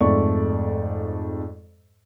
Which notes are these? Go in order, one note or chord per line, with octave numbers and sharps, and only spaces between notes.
F2 G#2 A3 D5 C#6